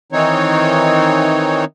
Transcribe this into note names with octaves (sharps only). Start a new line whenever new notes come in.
D#3 E3 C4 D#4 C#5